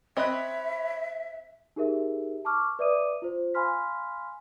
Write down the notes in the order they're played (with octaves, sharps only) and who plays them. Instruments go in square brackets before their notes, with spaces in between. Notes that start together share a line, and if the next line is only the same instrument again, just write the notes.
[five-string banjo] C4 D#5 [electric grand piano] C#5 B5 F#6 [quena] E5
[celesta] D#4 G4 G#4 A#4 E5
A5 C#6 D6 F6
B4 D5 E5 D6 D#6 D#7
F4 C5
F5 G#5 B5 C6 F6 B6